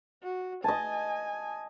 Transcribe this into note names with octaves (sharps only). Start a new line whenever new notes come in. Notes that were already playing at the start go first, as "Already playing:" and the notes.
F#4
D#5 G#5 A5